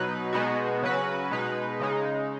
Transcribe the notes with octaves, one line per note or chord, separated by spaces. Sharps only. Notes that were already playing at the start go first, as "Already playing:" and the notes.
Already playing: B2 F#3 D#4 B4
B2 G#3 B3 D#4 F#4
C#3 F#3 C#4 F#4 B4
B2 G#3 D#4 B4
C#3 G#3 D#4